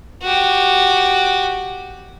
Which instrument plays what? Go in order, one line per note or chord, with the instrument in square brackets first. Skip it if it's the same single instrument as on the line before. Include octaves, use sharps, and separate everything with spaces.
[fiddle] F#4 G4